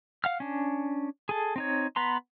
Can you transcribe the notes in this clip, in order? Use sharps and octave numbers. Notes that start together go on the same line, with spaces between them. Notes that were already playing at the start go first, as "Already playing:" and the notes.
F5 F#5 F6
C#4 D4
G#4 A4
C4 D#4 C#5
B3 B4 A#5 C6